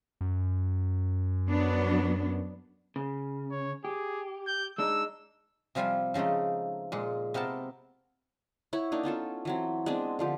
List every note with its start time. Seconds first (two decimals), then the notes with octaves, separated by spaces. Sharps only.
0.21 F#2
1.48 F#3 B3 D4
2.96 C#3
3.52 C#5
3.85 G4 G#4
4.47 G6
4.78 G#3 D4 D#4 E6
5.75 C3 F3 G3 F4 C5 G#5
6.14 C#3 F3 G#3 A3 D#4
6.92 A#2 G#3
7.34 C3 B3 A#4 C5 A5
8.73 E4 C#5 F#5
8.92 A#3 D4 D#4
9.03 B3 C#4 F4 A4
9.45 E3 F#3 C4
9.86 G#3 B3 C4 D4
10.19 D3 F3 G4